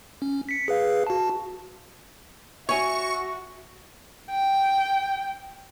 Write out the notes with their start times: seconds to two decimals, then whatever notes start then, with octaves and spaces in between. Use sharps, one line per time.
0.22 C#4
0.49 B6 C#7
0.68 G#4 B4 F5
1.07 F#4 A5
2.69 F#4 C#5 E5 G#5 C#6
4.31 G5